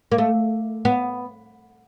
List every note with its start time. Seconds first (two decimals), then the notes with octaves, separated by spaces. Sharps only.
0.12 A#3
0.18 A3
0.85 B3